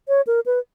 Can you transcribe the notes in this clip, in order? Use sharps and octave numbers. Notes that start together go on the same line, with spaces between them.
C#5
A#4
B4